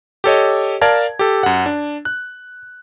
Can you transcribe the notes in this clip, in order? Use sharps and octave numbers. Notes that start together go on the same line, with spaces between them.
G4 A4 C#5 D#5
A#4 D5 F5 A5 G#6
G4 A4
F#2 F#5
D4
F#6